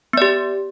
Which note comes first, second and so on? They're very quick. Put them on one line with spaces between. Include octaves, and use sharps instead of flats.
B3 D5 G4